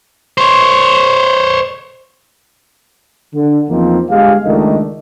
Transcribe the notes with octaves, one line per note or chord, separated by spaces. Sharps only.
C5 C#5
D3
E2 F3 A#3 C4 D#4
G1 G#3 G4 G#4 F5
C#2 D#3 A3 D4 D#5